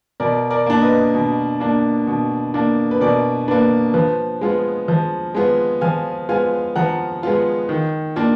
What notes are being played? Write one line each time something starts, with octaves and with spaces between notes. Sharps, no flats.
B2 A#4 D5
A#4 D5
A#3 D4
B4 D#5
B2
A#3 D4
B2
A#3 D4
B4
B2 A#4 D5
A#3 D4 B4
F3 B4
G#3 B3 F4
F3
G#3 B3 F4
F3 F5 G#5
G#3 B3 F4 F5 G#5
F3 F#5 A#5
G#3 B3 F4
D#3
A#3 D4 F4